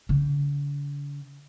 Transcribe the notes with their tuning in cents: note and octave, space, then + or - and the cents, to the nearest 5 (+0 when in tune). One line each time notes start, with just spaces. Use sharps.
D3 -45